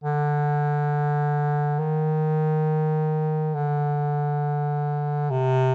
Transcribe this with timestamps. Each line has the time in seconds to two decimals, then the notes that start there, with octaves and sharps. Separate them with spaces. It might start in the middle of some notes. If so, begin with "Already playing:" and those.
0.04 D3
1.79 D#3
3.55 D3
5.31 C3